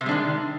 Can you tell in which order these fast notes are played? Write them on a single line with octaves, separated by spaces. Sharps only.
C3 G3 G#3 D4 D#3